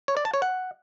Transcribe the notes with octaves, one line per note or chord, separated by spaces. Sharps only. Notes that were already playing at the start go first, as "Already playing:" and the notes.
C#5
D5
A5
C#5
F#5